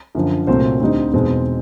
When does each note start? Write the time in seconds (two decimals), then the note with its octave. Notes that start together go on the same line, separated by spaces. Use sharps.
0.15 F#2 D3 F3
0.47 C2 A#2 F#3 A3 C4 C5
0.80 D2 D3 G3 C4 D#4
1.13 E2 B2 G#3 C4 D#4